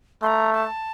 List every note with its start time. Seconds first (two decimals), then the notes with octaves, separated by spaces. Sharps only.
0.23 A3 C6
0.27 A#5
0.53 A5